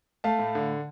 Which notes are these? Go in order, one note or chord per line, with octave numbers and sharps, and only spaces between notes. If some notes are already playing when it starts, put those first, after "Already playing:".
A3 F5 A5
A2
D3